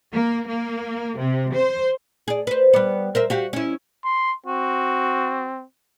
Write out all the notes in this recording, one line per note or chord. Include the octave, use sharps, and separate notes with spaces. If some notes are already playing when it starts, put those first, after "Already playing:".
A#3
A#3
C3
C5
G#4 D5
B4 C5
G3 B3
A#4 C5 E5
F#4 G4 F5
C#4 E4
C6
C4 F#4